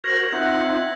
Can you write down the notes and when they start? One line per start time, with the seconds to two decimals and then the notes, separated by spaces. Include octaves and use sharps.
0.04 F#4 A#4 C5 G#6 A#6 B6 F#7
0.32 C4 D#4 F4 E5 F#5 A#5 G6 A#6
0.49 E6 F#6 B6